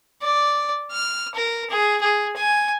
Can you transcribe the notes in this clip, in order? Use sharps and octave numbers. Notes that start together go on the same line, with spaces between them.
D5
F6
A#4
G#4
G#4
G#5